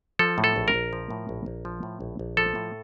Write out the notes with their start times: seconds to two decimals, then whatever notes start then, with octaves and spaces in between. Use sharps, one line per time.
0.19 F3 A4
0.38 A2
0.44 A4
0.56 A#1
0.68 A#4
0.74 A#1
0.93 F3
1.10 A2
1.29 A#1
1.46 A#1
1.65 F3
1.83 A2
2.01 A#1
2.19 A#1
2.37 F3 A4
2.55 A2